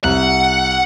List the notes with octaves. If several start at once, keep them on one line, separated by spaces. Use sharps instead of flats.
C2 F#5